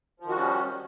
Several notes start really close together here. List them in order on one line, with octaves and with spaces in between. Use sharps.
F3 D#3 F#4 G3 C#4